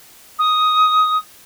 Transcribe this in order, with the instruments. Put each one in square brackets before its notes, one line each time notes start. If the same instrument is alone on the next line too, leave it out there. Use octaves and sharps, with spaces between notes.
[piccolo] D#6